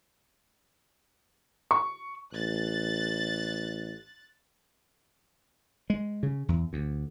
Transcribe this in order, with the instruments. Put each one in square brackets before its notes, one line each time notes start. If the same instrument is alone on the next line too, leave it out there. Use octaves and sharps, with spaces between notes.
[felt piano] C#6
[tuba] A1 [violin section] F#6 A6
[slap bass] G#3
C#3
E2
D2